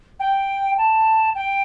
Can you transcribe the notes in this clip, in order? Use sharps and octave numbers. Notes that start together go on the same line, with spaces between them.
G5
A5
G5